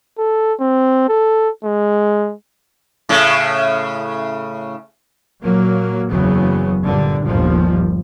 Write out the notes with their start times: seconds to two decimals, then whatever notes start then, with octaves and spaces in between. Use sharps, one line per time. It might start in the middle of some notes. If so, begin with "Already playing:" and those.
0.18 A4
0.60 C4
1.09 A4
1.64 G#3
3.09 A2 C#3
5.42 A#2 F#3 A#3
6.10 F#1 E2 C#3 F#3 B3
6.84 G2 A#2 D3
7.25 G1 D#2 A#2 F3 G3